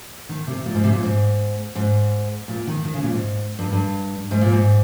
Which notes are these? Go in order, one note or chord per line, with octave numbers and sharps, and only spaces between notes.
D#3
C3
A#2
G#2
C3
A#2
G#2
G#2
A#2
D#3
D#3
C#3
A#2
G#2
G2
G2
G#2
A#2
G#2